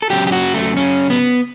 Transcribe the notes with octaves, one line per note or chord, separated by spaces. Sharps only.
A4
C#3 F#3 G4
G4
F#4
A3
C#4
B3